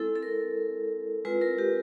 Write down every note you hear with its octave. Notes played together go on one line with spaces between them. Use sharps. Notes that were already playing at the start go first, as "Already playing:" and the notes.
Already playing: G#3 C4 E4 A4
A4
A#4
G#3 C4 F4 B4
A#4
G4